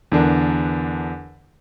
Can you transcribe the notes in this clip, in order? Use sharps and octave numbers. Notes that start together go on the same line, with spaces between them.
E2 D3 D4 A#4